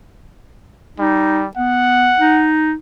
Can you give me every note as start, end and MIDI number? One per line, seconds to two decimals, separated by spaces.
0.99 1.48 55
0.99 1.43 63
1.57 2.12 59
1.57 2.51 78
2.19 2.74 63